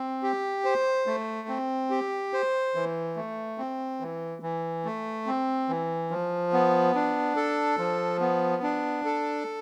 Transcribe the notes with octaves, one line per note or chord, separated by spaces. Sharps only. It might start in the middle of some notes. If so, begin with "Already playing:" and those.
Already playing: C4
G4
C5
A3
C4
G4
C5
E3
A3
C4
E3
E3
A3
C4
E3
F3
B3
D4
A4
F3
B3
D4
A4